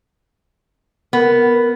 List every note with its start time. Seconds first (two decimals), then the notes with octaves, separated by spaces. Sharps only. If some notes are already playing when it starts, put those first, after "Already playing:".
1.13 B3 A#4